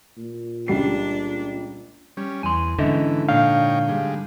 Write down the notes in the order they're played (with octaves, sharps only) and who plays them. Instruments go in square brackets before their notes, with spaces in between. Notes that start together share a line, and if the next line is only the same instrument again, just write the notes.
[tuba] A#2
[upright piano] C#2 G3 C7 [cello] D4
[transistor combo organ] G3 C#4
[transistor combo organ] E2 [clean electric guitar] G#5 C6
[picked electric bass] G#2 D3 [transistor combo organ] E3 [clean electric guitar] C#4 D#5 E5
[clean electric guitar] A#2 D4 [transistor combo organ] D#4 C#5 G5 [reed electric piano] F5
[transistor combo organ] G3 G#3